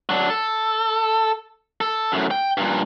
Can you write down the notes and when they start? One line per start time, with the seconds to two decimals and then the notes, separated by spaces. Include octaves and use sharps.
0.09 F#3 D4
0.30 A4
1.81 A4
2.12 F#2 A2
2.31 G5
2.57 G2 A#2